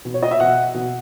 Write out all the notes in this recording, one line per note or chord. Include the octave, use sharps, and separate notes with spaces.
B2
C#5
D#5
E5
B2 F#5
B2